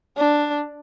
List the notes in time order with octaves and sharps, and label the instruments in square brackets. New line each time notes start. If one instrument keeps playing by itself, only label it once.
[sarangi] D4